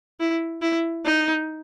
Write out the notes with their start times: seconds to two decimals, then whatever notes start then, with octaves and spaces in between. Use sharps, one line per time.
0.20 E4
0.62 E4
1.05 D#4